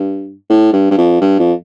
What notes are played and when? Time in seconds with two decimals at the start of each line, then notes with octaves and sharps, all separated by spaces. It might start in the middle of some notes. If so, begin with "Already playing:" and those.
Already playing: G2
0.50 A2
0.73 G2
0.91 G2
0.98 F2
1.21 G2
1.39 F2